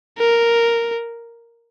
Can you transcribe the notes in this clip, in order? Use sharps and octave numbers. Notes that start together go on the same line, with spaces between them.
A#4